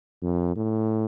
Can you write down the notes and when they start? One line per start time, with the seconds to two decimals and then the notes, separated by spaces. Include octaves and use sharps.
0.22 F2
0.56 A2